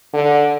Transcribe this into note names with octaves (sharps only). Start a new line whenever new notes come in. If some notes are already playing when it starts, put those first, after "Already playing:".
D3